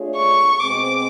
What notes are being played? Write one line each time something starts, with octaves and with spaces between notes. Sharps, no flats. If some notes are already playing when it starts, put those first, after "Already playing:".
Already playing: A3 D4 F4 G#4 C#5
C#6
B2 G#3 C4 D6